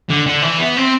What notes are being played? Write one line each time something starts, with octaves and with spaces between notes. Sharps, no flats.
D3
D3
E3
B3
C4